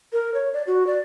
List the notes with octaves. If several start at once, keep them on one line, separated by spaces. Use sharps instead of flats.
A#4
C#5
D5
F#4
D5